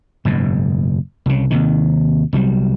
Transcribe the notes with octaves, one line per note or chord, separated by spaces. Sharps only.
F#1 G#2 B2
C2 C#3
D#2 C3 D#3
C2 F#3 G3